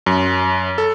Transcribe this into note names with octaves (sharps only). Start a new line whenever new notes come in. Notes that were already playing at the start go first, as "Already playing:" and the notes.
F#2
A4